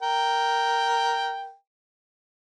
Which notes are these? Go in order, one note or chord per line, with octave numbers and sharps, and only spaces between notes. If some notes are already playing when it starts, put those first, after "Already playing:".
A#4 G5